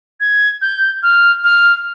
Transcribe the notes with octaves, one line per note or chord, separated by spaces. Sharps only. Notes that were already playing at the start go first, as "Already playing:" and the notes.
G#6
G6
F6
F6